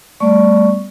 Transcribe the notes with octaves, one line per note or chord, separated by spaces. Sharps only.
G3 A3 B3 D5 C#6